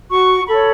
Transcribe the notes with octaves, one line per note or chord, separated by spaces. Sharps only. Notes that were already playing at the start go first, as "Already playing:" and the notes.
F#4 C#6
A4 C#5 B5